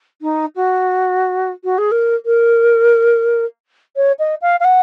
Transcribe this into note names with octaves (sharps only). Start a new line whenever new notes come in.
D#4
F#4
F#4
G#4
A#4
A#4
C#5
D#5
F5
F5
F#5